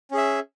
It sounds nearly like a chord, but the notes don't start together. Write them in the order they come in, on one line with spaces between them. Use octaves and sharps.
C#4 G#4 E5